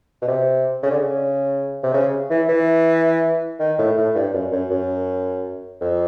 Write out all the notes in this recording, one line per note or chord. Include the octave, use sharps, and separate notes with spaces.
B2
C3
C#3
D3
C#3
C3
C#3
E3
E3
D#3
A2
A2
G2
F#2
F#2
F#2
F2